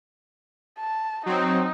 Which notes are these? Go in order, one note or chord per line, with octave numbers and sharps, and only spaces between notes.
A5
F#3 C4 D#4